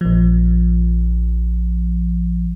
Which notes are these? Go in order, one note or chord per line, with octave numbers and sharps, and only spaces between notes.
A#1 F3